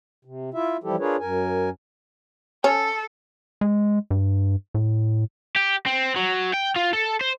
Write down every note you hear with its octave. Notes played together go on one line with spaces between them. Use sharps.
C3
E4 F4 E5
E3 F3 G3 E4 G4 A4
D4 F4 G#4 A#4 B4 C#5
F#2 A#4 G#5
C#4 A4
G#3
G2
A2
G4
C4
F#3
G5
F4
A4
C5